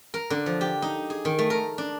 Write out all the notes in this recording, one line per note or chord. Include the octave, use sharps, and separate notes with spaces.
A#4
D3
F3
G4
D#4
G#4
D#3
A3
A#4
D4